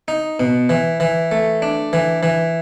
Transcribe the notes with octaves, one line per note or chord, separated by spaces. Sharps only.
D#4
B2
E3
E3
A3
D4
E3
E3